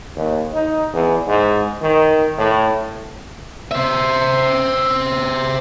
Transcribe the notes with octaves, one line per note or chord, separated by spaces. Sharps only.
D#2
D#4
E2
G#2
D#3
A2
C5 E5